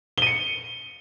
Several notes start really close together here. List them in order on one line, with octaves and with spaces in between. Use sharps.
G7 D#7 C#7